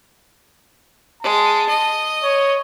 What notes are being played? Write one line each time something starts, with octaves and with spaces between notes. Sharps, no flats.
G#3 A5
D#5
C#5